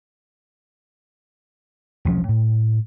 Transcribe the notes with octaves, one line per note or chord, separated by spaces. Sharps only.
E1 C2 F3 C#4
A2